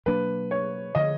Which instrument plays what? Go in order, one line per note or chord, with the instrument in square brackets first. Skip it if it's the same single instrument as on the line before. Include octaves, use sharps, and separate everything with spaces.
[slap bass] B2 F#3 A#3 D4 [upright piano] B4
[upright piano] C#5
[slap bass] D3 F3 [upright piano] D#5